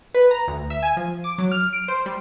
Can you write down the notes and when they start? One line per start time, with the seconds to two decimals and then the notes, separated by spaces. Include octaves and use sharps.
0.14 B4
0.31 A#5
0.48 D2
0.70 E5
0.83 G#5
0.97 F3
1.24 D6
1.38 F#3
1.52 F6
1.73 D7
1.88 C5
2.06 G3